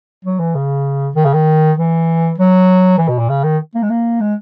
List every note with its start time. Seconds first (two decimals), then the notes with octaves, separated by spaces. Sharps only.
0.25 F#3
0.39 E3
0.55 C#3
1.15 D#3
1.25 C#3
1.33 D#3
1.77 E3
2.38 F#3
2.98 E3
3.08 B2
3.19 A#2
3.29 C#3
3.44 D#3
3.75 A#3
3.83 G#3
3.90 A#3
4.21 G#3